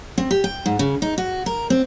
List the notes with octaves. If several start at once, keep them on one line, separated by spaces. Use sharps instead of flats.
C4
G4
G5
G#2
C#3
D#4
F#4
A#4
C4